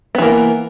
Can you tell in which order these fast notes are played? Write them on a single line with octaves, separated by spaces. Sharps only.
B3 E3 A#3